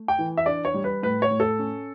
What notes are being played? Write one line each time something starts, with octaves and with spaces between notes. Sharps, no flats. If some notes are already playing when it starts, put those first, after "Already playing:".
Already playing: A3
G5
E3
E5
D4 D5
C#5
G3
B4
A2 B4
C#5
A2
A4
C#4